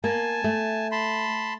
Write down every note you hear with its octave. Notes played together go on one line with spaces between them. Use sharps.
A#3 G#5 A5
A3
A5 B5 C6